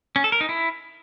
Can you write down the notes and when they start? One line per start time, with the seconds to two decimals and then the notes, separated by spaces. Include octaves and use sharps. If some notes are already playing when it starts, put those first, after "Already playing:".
0.16 C#4
0.24 A4
0.32 A#4
0.41 D#4
0.49 E4